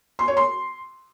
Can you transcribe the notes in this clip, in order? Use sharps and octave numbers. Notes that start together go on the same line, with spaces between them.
C6
C#5
C6